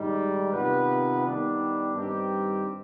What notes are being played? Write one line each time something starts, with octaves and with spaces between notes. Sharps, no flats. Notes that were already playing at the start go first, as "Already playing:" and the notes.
Already playing: G#2 D#3 G3
C3 D#3 B3 F4 B4
D#3 G3 B3 D4
G2 D#3 G3 C4 G4